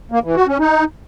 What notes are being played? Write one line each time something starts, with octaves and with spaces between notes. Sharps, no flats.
A#3
E3
F#4
C#4
D#4